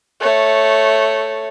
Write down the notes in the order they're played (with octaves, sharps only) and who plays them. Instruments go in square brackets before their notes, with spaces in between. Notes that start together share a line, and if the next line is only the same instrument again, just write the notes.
[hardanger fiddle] A3 C#5